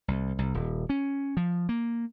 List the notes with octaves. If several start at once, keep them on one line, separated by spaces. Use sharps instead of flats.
C2
C2
D#1
C#4
F3
A#3